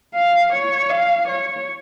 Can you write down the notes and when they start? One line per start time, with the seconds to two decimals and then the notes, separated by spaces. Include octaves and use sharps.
0.14 F5
0.52 C#5
0.90 F5
1.28 C#5